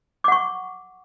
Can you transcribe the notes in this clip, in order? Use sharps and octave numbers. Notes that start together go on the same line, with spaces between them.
F#5 C#6 D6